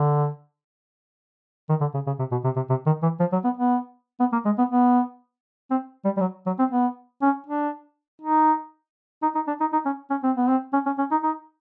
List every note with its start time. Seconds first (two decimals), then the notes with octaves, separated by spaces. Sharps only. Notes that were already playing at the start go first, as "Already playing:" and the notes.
Already playing: D3
1.69 D#3
1.81 D3
1.94 C#3
2.07 C#3
2.19 C3
2.31 B2
2.44 C3
2.56 C3
2.70 C3
2.86 D#3
3.03 E3
3.20 F3
3.32 F#3
3.44 B3
3.57 B3
4.20 B3
4.32 A#3
4.45 G#3
4.58 B3
4.70 B3
5.71 C4
6.05 G3
6.17 G3
6.21 F#3
6.46 F#3
6.59 C4
6.71 B3
7.22 C#4
7.47 D4
8.22 D#4
9.23 D#4
9.35 D#4
9.48 D4
9.60 D#4
9.73 D#4
9.86 C#4
10.10 C#4
10.23 C4
10.37 B3
10.48 C4
10.73 C#4
10.86 C#4
10.98 C#4
11.11 D#4
11.24 D#4